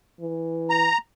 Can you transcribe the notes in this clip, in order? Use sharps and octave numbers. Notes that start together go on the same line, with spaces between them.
E3
A#5